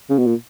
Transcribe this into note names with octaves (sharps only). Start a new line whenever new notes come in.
C#3
B2
A#2